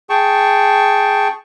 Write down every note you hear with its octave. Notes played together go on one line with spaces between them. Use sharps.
G#4 G5 A5 C#6